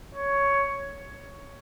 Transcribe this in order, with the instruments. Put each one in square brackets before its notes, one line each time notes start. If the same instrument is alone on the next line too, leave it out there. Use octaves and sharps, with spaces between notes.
[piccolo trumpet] C#5